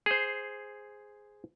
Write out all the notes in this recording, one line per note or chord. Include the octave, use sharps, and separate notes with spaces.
G#4 C5